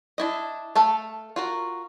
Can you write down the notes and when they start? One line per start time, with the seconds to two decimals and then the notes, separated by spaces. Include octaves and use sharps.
0.18 D4 E4 D#5
0.75 A3 A4 F5
1.36 F4 F#4 A#4